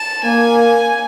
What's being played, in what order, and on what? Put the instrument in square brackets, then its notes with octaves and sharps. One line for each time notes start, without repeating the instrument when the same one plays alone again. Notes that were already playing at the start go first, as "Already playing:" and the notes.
Already playing: [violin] A5
[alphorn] A#3 [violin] G#5